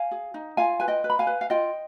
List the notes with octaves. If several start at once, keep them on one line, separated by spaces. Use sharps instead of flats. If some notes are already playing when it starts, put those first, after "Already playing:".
Already playing: F5 G#5
G#4
D#4
F4 F5 G#5
B4 G#5
D#5 G5
B4
B5
F5 G#5
B4
F5
F4 D#5 G5